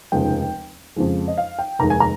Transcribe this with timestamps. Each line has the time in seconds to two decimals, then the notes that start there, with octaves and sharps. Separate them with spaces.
0.12 F1 D#2 C#3 F3 G#3 G5
0.96 F2 C#3 F3 G#3
1.28 D#5
1.37 F5
1.59 G5
1.79 F1 D#2 D#3 G#3 A#5
1.90 G#5
2.00 A#5